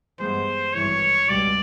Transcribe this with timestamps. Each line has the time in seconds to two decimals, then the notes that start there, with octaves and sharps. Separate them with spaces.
0.19 G2 E3 G#3 B3 C5
0.73 G#1 G2 E3 C#5
1.29 C#2 B2 G3 D5